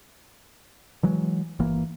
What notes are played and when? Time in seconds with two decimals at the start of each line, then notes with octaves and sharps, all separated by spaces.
1.03 E3 F#3 G#3
1.59 G1 E3 A#3